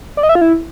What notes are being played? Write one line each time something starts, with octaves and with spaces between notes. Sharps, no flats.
D5
D#5
E5
F4
E4